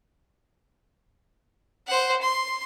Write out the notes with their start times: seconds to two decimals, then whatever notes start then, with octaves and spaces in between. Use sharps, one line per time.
1.87 C5 F#5
2.22 C6